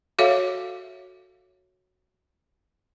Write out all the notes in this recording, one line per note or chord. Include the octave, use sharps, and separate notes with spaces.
F#4 A4 C#5 E5 F5